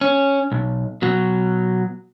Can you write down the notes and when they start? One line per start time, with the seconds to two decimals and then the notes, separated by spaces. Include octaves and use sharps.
0.01 C#4
0.52 B1
1.02 B2 F#3